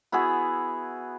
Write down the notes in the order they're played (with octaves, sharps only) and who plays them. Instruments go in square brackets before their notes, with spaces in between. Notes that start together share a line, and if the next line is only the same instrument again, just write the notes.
[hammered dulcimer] B3 E4 F#4 G#4